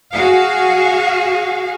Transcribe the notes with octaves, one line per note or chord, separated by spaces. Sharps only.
F#4 G#4 F5